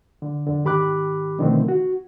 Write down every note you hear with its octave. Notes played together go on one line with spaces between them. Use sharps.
D3
F2 D3
G#2 D#3 G4 B5 D6 F#6
B2 D3 D#3 F3 A3 C4
F#4